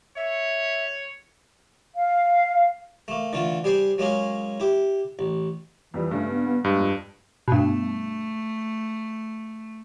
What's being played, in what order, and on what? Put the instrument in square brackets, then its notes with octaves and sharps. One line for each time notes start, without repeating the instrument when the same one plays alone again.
[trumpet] C#5 [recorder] E5
[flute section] F5
[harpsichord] A3 A#3
D3 E3 A3 F4
G3 G#4 C5 D5
F#3 G#3 A#3 C#4 G#4
E4 G4
A1
[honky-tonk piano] F2 G3 [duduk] E3
[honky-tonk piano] G2 C#3 [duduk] A3
[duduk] B3
B3
[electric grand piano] G2 [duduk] G#3
[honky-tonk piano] F2
[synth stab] G2 B2 [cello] A3